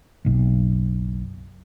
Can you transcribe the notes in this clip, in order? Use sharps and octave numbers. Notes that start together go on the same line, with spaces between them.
F#1 B1